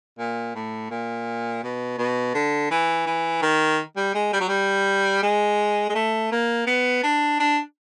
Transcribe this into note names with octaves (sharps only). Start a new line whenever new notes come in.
A#2
A2
A#2
B2
B2
D3
E3
E3
D#3
G3
G#3
G3
F#3
G3
G#3
G#3
A3
A#3
B3
D4
D4